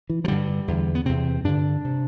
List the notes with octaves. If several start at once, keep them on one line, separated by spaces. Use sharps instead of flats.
E3
F3
G2 D3 G3
E2 D3
B3
E2 C3 C4
G2 D3 D4
C3